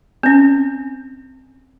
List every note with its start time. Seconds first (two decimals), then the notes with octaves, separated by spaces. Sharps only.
0.23 C4 C#4